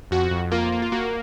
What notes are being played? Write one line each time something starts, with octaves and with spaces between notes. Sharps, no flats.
F2 F#4
F2
A#3 F4
A#3
F4
A#3 F#4